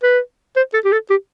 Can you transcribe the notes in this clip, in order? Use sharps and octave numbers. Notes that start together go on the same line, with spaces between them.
B4
C5
A4
G4
A4
G4